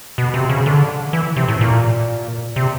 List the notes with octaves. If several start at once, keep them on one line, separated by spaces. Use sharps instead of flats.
B2
C3
C#3
D3
E3
C3
A2
A#2
C3